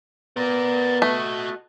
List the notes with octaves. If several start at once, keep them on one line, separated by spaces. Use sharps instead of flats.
B3 A#4 D5
A3 F#4 D#5